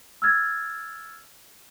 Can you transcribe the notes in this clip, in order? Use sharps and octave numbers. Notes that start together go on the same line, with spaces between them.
E6 F6 G#6 A6